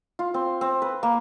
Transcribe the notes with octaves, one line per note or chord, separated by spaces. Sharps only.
F4
C4
C4
B4
A#3